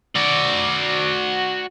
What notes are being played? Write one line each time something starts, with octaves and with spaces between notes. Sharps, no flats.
F#4 D5